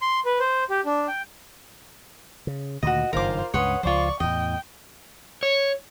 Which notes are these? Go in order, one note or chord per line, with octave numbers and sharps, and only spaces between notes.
C6
B4
C5
G4
D4
G5
C#3
D2 A#2 D#3 F#4 D#5
F#1 G2 D#3 F4 A#4 C5 D6
C#2 G2 B4 C#5 F#5 C6 D#6
C#2 F3 F4 C5 D5 C#6
E2 A2 D#5 G5
C#5